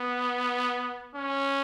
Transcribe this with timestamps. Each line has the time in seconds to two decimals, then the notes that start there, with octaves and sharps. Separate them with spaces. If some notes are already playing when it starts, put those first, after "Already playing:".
Already playing: B3
1.15 C#4